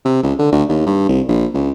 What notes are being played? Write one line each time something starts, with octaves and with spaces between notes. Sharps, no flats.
C3
C#2
D3
D2
D#2
G2
C2
A#1
C#2